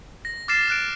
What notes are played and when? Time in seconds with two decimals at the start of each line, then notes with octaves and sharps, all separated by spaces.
0.25 A#6
0.48 D6 F6 A6 A#6 C7 E7
0.68 F6 F#6 D7